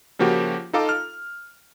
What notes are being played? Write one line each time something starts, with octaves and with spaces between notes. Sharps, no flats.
C#3 F3 A#3 F#4 G4
D#4 F4 A4 F5 A#5 D6
F6